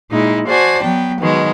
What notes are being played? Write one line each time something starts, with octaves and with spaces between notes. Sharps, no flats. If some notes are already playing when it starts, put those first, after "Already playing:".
A#2 G#3 D#4 E4
F#4 C5 D5 G#5 A5
F#3 B3 G5
B2 D#3 F#3 G#3